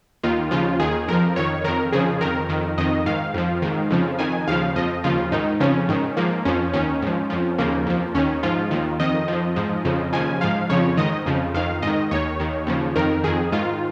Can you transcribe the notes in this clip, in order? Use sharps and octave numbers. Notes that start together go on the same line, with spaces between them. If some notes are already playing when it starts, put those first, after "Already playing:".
D#2 D#3 F4
D#2 C#3 F3 F4
D#2 D#3 G#4
F2 F3 A#4
F2 D#3 C#5
F2 D#3 A#4
F2 C#3 F3 G#4
F2 D#3 A#4
F2 D#3
F2 D#3 D#5
G#2 D#3 F5
F2 F3
G#2 D#3
F2 C#3 F3
F2 D#3 G#5
D#2 C#3 F3 F5
F2 F3 D#5
D#2 C#3 F3 F4
G#2 D#3 D#4
F2 C#3 F3 C#4
G#2 D#3
G#2 F3 A#3
F2 F3 C#4
D#2 D#3 C#4
G#2 F3
F2 F3
D#2 C#3 F3 A#3
F2 F3
D#2 D#3 C#4
G#2 F3 F4
D#2 D#3
F2 D#3 D#5
F2 F3
G#2 F3
F2 C#3 F3
D#2 C#3 F3 G#5
G#2 F3 F5
F2 C#3 F3 C#5
G#2 D#3 D#5
F2 C#3 F3
F2 D#3 F5
G#2 D#3 D#5
D#2 D#3 C#5
D#2 D#3
D#2 C#3 F3
F2 D#3 A#4
F2 D#3 G#4
G#2 D#3 F4